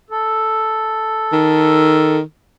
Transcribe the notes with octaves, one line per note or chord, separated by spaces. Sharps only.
A4
D#3